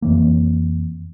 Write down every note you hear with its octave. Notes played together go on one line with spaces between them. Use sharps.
F2 E3 A#3